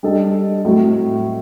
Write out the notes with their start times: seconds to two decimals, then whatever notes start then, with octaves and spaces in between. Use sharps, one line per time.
0.03 G3 D4 A4 D#5
0.65 A2 F#3 C4 F#4